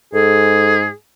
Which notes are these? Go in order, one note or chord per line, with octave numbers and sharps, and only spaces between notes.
G#2 G#4 A4